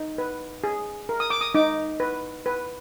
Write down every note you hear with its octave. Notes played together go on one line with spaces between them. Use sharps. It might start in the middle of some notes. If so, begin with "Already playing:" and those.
Already playing: D#4
B4
G#4
A#4
D#6
D6
D#6
D#4 D6
B4
B4